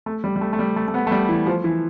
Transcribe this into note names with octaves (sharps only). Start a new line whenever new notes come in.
A3
G3
G3
A3
A3
G3
A3
A3
B3
A3
G3
E3
F3
E3